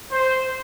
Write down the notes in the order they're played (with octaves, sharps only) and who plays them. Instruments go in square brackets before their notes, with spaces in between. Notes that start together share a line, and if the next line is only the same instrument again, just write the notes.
[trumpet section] C5